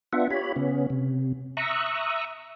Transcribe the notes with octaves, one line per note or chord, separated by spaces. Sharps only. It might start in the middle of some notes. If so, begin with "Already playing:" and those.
B3 D4 F4 E5 F#5
F4 G4 C#5 B5
C#3 B3 C#4
C3
E5 A#5 C#6 D#6 E6 F#6